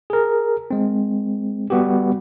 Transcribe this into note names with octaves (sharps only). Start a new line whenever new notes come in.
G#4 A#4
G#3 C4
G3 B3 F#4 G4